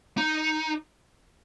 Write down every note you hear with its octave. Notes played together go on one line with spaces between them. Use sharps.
D#4